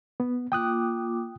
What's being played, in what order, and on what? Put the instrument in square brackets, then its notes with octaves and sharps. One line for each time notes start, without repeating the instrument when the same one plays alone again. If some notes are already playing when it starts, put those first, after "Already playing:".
[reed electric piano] B3
[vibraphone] A#3 F4 D6 [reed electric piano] G5 D#6 F#6